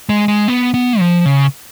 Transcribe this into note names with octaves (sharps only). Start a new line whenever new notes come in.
G#3
G#3
B3
B3
F3
C#3